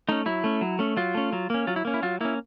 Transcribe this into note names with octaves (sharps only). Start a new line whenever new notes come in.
A3 C#4 D#4
F#3 E4
A3 C#4
F#3
A3 C#4
F#3 F4
A3 C#4
F#3
A#3 C#4
F#3 F4
E4
A#3 C#4
E4
F#3 F4
A#3 C#4 E4